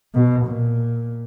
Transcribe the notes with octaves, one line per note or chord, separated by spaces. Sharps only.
B2
A#2